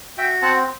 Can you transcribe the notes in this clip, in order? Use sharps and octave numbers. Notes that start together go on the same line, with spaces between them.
F#4 E5 G5
C4 F#5 A5